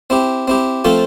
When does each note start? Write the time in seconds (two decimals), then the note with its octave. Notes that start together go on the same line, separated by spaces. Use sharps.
0.10 C4 E4 G4
0.48 C4 E4 G4
0.85 F3 A3 C4 F4 A4